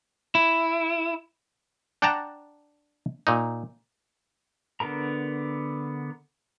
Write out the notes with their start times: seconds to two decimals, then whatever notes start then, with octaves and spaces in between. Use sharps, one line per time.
0.35 E4
2.02 D4 F#5 G5 A5 A#5
3.27 A#2 D#4
4.80 D3 B3 A#4 A#5